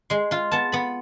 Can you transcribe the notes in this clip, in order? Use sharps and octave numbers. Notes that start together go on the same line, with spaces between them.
G#3 C6
F4 C6
B3 A5
B3 B5